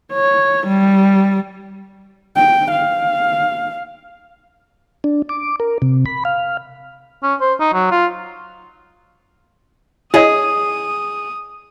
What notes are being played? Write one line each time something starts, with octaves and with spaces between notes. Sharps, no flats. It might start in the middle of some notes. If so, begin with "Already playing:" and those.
C#5
G3
G5
F5
D4
D6
A#4
C3
B5
F5
C#4
C5
D#4
F#3
F4
E4 G#4 C#5 D#5 D#6